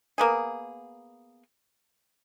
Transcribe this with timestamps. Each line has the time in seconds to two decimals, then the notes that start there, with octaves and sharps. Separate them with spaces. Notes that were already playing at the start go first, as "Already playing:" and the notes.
0.18 A#3 B3 G#4